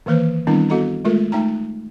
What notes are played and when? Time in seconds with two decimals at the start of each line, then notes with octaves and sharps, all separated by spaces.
0.06 D#3 E3 A#3 B4 C5
0.47 D#3 G3 B3 C4 D4 E4
0.70 B3 F#4 A4 D#5 A#5
1.05 G#3 A3 F4 A4 A#4
1.32 A3 D#4 G5 A#5